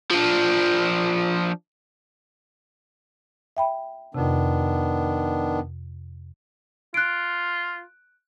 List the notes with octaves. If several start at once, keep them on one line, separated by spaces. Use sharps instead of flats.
F3 D4
E5 G5 B5
F2 C3 D#3 B3 D4
F4 F#6 D7